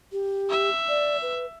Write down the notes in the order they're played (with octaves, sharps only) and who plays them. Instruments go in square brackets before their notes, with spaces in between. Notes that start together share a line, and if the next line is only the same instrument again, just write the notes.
[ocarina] G4
[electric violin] E5
[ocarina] D5
B4